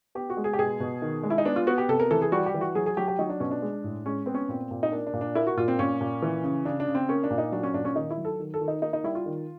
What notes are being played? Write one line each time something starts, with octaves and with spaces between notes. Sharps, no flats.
B3 G4
F#4
G#3
G#4
G4
B2 G#4
B2
D#3
G#3
E4
D#4
B3 D4
F4
B3 F#4
G4
C3 A4
A#4
E3 A4
G#4
G3 F#4
G4
E3
F#4
F#3 G#4
G#4
F#3 G4
G4
F#3 D#4
D4
B2 C#4
D4
G#3
A2
G#3 C#4
B3 C4
C#4
A#2 C4
A#2
D#4
A#3 D4
D4
A#2
D4
A#3 E4
F#4
A#2 F4
C4
A#2 C#4
A#2
E3
C#3
C#3 D4
D4
C#3
C4
A#3 C#4
D4
A#2
D#4
F#3 D4
C#4
A#2 D4
C#4
D#3 D#4
E4
F#3
A4
D#3
A4
D#3
D#4
A#3 D#4
D#4
G3 E4
F4
D#3